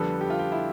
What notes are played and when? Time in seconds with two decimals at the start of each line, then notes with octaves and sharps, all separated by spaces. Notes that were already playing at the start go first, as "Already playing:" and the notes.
Already playing: F2 D3 G3 B3 A4
0.21 G4
0.30 F4
0.39 G4
0.52 E4